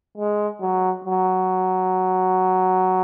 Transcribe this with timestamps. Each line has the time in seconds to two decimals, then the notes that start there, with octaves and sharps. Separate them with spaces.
0.18 G#3
0.61 F#3
1.05 F#3